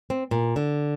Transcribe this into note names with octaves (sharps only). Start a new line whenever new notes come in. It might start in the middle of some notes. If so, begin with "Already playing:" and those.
C4
A#2
D3